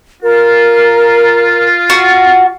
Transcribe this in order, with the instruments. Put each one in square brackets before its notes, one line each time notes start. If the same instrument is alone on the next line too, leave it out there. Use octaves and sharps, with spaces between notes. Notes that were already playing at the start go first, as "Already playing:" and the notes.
[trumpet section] F4 [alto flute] A#4
[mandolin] F#4